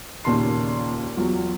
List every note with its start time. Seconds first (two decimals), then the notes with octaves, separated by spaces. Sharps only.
0.24 D#2 A#2 C#3 A5 C6 C7
1.17 E2 F#3 F4